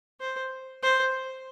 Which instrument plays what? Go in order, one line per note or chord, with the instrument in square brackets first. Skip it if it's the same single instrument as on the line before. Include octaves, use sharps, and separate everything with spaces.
[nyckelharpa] C5
C5